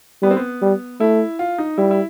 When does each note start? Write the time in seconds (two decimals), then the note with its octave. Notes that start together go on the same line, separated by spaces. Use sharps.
0.22 G3 B3
0.31 C4
0.37 B3
0.62 G3
1.00 A3 E4
1.39 F4
1.58 D#4
1.78 G3 E4
1.91 E4